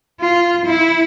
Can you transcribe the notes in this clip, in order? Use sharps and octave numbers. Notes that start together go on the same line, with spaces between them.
F4
E4